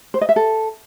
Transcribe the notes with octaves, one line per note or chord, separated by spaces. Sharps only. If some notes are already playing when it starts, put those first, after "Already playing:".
C5
D#5
E5
A4